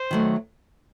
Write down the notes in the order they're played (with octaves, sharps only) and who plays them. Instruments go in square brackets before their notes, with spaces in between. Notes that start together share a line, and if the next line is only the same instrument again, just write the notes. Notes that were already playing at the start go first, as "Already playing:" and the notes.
Already playing: [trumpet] C5
[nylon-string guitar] D#3 F#3 A3